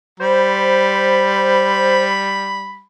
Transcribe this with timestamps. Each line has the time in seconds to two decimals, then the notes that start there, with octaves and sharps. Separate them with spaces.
0.20 G3 C5 B5